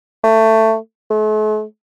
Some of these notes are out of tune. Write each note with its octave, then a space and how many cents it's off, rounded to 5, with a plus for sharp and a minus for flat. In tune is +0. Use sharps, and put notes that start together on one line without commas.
A3 +15
A3 -45